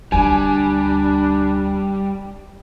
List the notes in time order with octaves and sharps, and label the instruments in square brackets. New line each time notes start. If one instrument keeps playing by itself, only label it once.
[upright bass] D2 D3 [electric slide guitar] G3 [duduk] D4 [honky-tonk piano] G#5